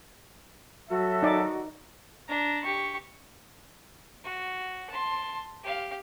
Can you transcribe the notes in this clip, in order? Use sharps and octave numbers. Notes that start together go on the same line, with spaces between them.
F#3 F#4 A4 E5
D#4 D5
D4 A#5
G4 C#6
F#4
A5 C6
G4 F5